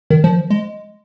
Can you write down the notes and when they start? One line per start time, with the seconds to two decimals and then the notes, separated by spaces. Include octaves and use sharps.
0.10 D#3
0.24 F3
0.50 G#3